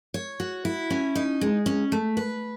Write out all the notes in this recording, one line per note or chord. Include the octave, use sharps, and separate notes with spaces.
C#5
F#4
E4
C#4
D#4
G#3
C#4
A3
B4